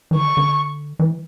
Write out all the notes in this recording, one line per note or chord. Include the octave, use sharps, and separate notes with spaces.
E3
D3 C#6
D3
E3